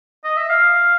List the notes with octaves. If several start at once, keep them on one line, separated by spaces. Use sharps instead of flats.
D#5
E5
F5